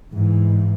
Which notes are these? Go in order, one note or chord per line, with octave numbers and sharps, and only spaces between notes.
G#2 E3